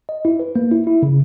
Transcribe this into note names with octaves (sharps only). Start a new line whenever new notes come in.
D#5
E4
B4
A#3
E4
E4
C#3